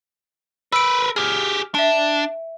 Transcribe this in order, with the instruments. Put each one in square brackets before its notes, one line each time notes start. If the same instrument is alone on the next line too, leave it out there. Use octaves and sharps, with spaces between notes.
[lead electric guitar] A#4 B4 [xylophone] E6 D7
[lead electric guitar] G4 G#4 [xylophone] F6
[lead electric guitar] D4 [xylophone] E5 D7